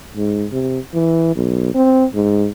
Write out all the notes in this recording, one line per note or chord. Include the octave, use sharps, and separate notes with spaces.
G#2
C3
E3
B1
C4
G#2